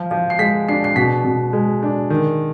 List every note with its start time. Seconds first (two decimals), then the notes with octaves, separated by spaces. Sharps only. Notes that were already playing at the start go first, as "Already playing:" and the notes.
Already playing: F3
0.11 F3
0.30 C7
0.39 G#3 B6
0.68 D4 C7
0.84 C7
0.96 B2 B6
1.24 B2
1.53 G#3
1.83 D4
2.10 D#3